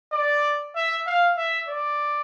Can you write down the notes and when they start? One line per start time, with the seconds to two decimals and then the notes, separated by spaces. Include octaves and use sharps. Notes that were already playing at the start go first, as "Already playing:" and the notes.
0.12 D5
0.76 E5
1.07 F5
1.37 E5
1.68 D5